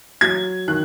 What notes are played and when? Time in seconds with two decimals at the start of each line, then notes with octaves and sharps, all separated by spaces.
0.21 F#3 G#6
0.68 D#3 F#6